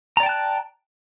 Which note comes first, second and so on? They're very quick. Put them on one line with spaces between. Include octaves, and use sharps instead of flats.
A#5 D5 G5 A5 F#6